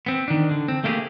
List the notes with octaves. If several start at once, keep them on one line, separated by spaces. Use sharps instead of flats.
B3 C4
D#3 D4
D3
C4
A3 A#3 D4 E4 G4 G#4